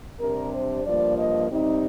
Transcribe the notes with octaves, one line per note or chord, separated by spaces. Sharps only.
C3 G3 D4 A#4
C5
G2 F3 A#3 D5
D#5
C3 G3 C4 D#4